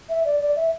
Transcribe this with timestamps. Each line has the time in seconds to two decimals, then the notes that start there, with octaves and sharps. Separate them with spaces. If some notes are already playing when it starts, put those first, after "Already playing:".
0.09 E5
0.25 D5
0.40 D5
0.56 E5